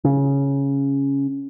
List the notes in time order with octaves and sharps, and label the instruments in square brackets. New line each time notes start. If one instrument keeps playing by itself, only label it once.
[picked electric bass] C#3